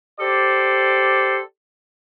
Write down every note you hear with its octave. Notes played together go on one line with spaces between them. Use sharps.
G4 A4 C5 D5